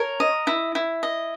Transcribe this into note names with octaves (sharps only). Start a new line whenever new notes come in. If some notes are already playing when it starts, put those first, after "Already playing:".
Already playing: A#4 C#5
D#5
E4
E4
D#5